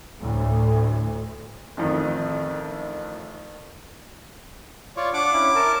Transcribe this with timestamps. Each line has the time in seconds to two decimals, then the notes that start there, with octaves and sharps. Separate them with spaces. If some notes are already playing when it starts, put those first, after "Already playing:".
0.20 D2 A2
1.77 A1 F2 D#3
4.97 F4 C#5 D5
5.14 D4 F#5 D6
5.33 C#4 E4
5.55 A#4 A5